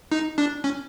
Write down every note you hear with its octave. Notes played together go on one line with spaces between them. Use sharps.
D#4
D4
C#4